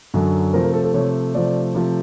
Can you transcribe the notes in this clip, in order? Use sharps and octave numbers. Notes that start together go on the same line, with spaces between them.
F#2 D3 F#3
C3 F3 A3 A#4
A#4
A4
A4
C3 F3 A3 C#5
C3 F3 A3 D5
C3 F3 A3